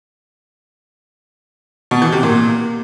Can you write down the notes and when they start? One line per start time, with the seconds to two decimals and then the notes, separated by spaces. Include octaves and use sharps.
1.91 B2
2.02 E3
2.12 C3
2.23 A#2